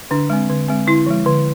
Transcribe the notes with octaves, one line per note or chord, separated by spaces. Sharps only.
D3 D4
G#3 C4
D3
G#3 C4
D3 E4
F3 G#3
D3